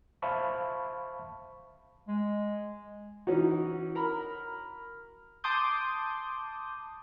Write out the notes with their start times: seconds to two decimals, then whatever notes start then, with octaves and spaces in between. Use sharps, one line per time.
0.22 C5 E5 F5 A5 B5 C#6
2.08 G#3
3.27 E3 C#4 D#4 F#4
3.95 A#4 A#5 B5
5.44 A5 C6 D6 D#6 G6